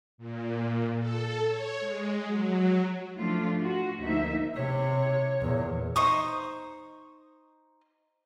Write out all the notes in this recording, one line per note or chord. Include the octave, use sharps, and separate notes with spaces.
A#2
A4
C#5
G#3
F#3
F3 A3 D4 F4
F#4
D2 F3 A#3 D#4 E5
C3 C#5
E2 A#2
D#4 C5 C#6 D#6